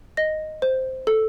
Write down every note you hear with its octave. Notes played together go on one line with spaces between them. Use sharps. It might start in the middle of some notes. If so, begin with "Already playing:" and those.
D#5 A#6
C5
A4